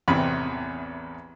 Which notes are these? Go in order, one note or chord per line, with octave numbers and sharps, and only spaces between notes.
A1 E2 C3 B5